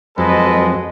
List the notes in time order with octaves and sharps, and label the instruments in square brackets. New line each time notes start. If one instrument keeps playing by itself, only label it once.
[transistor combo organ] F2 F#3 C4 [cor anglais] G#3 [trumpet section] A4 B4 D#5